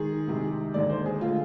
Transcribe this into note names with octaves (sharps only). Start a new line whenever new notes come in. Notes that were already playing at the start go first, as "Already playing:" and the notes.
Already playing: D#3 G#3 G#4
C2 C3 D#3 G#3
D#2 D3 G#3 D5
C5
G#4
D3 G#3 F4